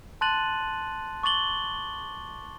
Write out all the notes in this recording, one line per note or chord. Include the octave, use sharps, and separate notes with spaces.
A5 C6 F#6 A6 D#7 F#7
C#6 D6 A6 F#7 G7